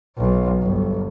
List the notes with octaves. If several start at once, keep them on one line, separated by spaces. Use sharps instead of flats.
B1
G1